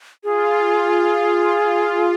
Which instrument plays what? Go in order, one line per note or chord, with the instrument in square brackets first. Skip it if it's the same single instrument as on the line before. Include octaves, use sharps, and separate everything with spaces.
[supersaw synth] F4 [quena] G#4